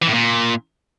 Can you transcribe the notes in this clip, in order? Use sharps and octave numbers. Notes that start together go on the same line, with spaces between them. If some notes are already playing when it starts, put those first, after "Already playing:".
E3
A2
A#2